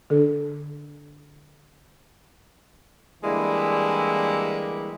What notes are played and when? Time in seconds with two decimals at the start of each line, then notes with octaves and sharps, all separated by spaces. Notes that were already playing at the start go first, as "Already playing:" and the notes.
0.10 D3 D4 A4
3.23 D3 E3 G3 G#3 A#3 E4